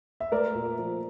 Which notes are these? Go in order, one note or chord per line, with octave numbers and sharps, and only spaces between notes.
E5
A3 A#4 D5
A#2
F3